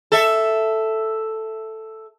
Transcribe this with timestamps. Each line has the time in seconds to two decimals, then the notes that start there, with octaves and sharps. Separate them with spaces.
0.12 A4 E5